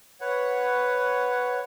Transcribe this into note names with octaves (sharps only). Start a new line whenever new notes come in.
B4 C#5 F#5